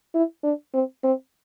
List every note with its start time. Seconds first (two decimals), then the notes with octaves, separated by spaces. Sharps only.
0.14 E4
0.44 D4
0.74 C4
1.04 C4